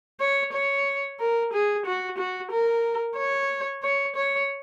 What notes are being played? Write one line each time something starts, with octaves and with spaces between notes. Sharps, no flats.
C#5
C#5
A#4
G#4
F#4
F#4
A#4
C#5
C#5
C#5